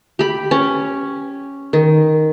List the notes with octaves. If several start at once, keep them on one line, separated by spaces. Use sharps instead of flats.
G4 B5
C#4
D#3